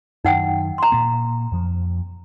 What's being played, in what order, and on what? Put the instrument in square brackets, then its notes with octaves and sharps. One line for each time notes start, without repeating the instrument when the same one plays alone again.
[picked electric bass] F#2 D#3 [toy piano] D#4 F#5 G5
[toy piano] A#5 C6
[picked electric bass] A#2 A#3
F2 F3